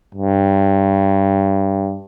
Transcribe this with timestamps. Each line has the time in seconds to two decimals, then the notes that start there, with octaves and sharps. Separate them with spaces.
0.15 G2